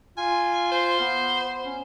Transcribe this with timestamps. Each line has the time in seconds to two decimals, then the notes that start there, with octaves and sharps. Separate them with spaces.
0.18 F4 G#5
0.72 C5
1.00 B3
1.66 C#4